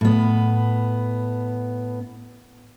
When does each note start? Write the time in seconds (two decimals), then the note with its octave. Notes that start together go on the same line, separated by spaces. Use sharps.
0.01 A2 B3